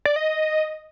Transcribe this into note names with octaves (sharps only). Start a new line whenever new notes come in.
D5
D#5